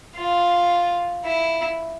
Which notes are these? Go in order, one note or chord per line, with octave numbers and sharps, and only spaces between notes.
F4
E4